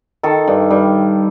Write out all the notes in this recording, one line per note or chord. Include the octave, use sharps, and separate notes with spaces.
D#3 A4
G2
G2